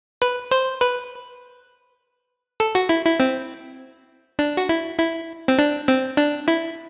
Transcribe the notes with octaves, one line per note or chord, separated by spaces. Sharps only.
B4
C5
B4
A4
F#4
E4
E4
C4
D4
F#4
E4
E4
C4
D4
C4
D4
E4